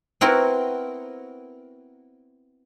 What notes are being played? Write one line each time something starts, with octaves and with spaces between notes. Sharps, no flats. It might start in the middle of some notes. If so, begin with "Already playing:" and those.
B3 C4 E4 F#4 A#4